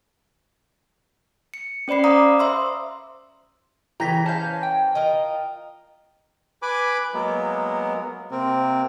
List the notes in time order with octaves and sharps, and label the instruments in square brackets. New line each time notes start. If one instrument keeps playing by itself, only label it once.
[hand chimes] C#7
C#4 C5 D5 B5 C7
F5 A#5 D6 D#6
C5 E5 C6 E6
[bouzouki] C#3 G5 [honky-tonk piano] E3 [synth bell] A#5 A#6 B6
[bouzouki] C#4 C5 F5 [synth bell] A5 G6
[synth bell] G5
[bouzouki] F4 A#4 D#5
[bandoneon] B4 G#5 B5 D6
F#3 G#3 A#3 B3
C3 A#3 C4